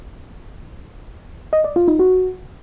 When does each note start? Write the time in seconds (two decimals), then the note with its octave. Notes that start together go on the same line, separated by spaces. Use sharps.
1.53 D#5
1.64 D5
1.76 F4
1.88 D#4
1.99 F#4